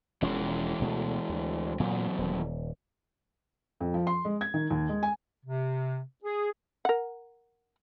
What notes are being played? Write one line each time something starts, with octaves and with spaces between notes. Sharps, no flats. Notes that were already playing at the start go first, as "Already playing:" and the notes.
E1 E3 F3 G#3 C#4
D2 B2 A3
D2
E2 A#2 F#3
D#1
F2
F3
C6
G#3
G#6
D#3
D#2
G#3
G#5
C3
G#4
A#4 F#5